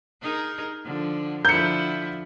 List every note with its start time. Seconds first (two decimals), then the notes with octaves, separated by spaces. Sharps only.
0.22 D#4 G#4 A#4
0.84 D3 F3
1.45 D3 F3 E4 G6 C#7